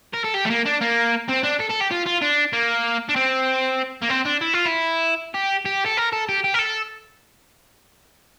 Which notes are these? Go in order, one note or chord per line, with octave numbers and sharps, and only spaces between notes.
A#4
A4
G4
A3
A#3
D4
A#3
C4
D4
A4
A4
G4
F4
F4
D4
A#3
D4
C4
A#3
C4
D4
E4
F4
E4
G4
G4
A4
A#4
A4
G4
G4
A#4
A4